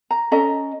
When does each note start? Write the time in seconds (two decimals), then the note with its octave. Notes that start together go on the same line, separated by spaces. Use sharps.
0.11 A#5
0.31 C#4 A4 D#5 A#5